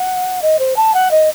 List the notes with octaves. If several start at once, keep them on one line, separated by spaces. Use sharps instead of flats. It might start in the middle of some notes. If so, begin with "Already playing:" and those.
Already playing: F#5
D#5
C5
A5
F#5
D#5